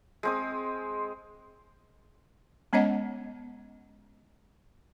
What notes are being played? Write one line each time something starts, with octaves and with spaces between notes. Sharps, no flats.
G#3 C4 D#6
G#3 B3 C#4 C#5 D#5 F#5